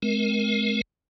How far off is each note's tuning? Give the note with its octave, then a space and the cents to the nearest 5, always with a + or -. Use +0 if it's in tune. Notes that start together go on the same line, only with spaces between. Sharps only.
G#3 +40 C4 +0 A#4 +20